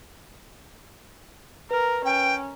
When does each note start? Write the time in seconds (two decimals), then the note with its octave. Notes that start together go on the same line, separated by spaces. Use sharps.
1.71 A#4 B4
2.05 C#4 G5